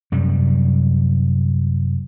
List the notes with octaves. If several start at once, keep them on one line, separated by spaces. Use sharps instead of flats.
F#2 C3 G3